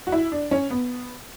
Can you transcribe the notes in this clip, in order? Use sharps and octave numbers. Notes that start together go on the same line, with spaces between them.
F#4
E4
D4
C#4
B3